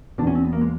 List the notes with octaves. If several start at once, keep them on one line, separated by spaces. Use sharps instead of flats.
E2 B2 D4
C#4
C4
B3
A#3
G#3